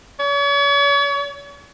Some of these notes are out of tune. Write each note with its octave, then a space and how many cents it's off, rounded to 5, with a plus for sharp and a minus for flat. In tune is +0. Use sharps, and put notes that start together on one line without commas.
C#5 +40